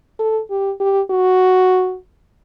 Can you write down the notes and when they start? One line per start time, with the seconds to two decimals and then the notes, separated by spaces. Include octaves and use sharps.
0.19 A4
0.50 G4
0.80 G4
1.11 F#4